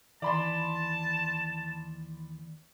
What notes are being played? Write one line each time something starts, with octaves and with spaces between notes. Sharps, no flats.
D#2 E3 D5 A5 B5 C6